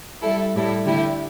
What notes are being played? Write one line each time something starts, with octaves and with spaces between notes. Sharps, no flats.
G3 E4 A4
A2 G3 E4 A4
D3 A3 E4 G4